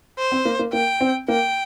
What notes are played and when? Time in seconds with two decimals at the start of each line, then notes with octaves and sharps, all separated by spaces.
0.18 C5
0.32 C4
0.45 A#3
0.59 A#3
0.73 A#3 G5
1.01 C4
1.28 A#3 G5